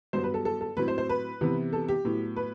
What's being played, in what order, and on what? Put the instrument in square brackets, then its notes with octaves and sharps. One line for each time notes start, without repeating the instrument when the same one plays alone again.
[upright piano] G2 F#3 B3 C5
B4
A4
A4
A4
A2 F#3 C4 B4
C5
C5
B4
C3 E3 B3
A4
G4
A2 F#3 B3
B4